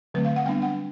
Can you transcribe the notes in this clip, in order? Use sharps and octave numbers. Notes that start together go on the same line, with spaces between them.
D3 F#3 A3 C4 B4
F5
F#5
G3 B3 D4 G5
F#5